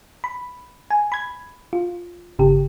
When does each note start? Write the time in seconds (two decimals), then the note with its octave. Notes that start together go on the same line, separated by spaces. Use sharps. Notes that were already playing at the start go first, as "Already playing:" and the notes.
0.24 B5
0.91 G#5
1.12 B5 G#6
1.73 F4
2.39 G1 C#3 G4